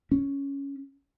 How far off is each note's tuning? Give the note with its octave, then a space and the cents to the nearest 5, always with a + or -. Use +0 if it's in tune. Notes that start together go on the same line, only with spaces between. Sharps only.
C#4 +5